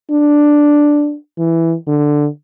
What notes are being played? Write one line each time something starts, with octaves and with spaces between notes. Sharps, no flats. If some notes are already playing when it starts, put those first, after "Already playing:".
D4
E3
D3